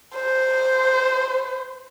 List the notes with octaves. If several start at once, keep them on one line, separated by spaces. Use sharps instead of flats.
C5